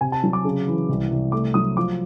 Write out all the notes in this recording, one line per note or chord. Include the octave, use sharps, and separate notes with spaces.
C3 G#5
A5
F#3
D6
C#3
E3
C2
C2
A3 D6
F#3 D#6
F3 D6